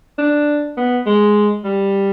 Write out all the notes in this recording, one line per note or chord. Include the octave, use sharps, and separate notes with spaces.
D4
B3
G#3
G3